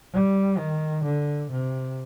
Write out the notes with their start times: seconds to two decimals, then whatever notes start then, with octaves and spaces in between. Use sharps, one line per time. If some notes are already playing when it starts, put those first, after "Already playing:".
0.13 G3
0.58 D#3
1.04 D3
1.51 C3